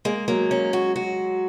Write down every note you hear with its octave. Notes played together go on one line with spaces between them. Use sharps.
G#3 A#3
F#3 A#3
C#4
F#4
F#4